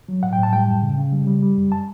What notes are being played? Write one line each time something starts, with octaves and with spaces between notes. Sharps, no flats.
F#3
A2 F#5
G5
A2
A5
G3 G5
F#2
C#3
C#3
G3
G3
G3
F#2
A5